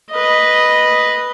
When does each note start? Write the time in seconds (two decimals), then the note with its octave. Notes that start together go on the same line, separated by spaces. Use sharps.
0.11 B4 D#5